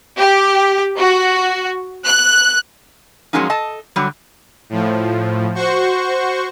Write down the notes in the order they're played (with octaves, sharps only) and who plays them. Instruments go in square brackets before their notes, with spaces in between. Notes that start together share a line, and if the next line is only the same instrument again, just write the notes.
[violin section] G4
F#4
F#6
[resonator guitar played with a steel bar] F3 F#3 G#3 A#3 C#4 D#4
A4 D#5 A5
D3 F#3 G3
[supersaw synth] A2 F3
F#4 C5 C#6